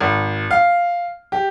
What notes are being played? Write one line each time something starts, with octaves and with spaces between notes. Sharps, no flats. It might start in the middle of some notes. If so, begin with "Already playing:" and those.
G#1
F5
G4